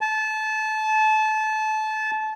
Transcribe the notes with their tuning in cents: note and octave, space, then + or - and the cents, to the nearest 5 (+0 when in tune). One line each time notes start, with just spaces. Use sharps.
A5 -25